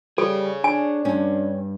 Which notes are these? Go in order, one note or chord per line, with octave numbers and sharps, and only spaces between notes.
G3 G#4 A4 C#5
D4 G#5
G2 C#4 D4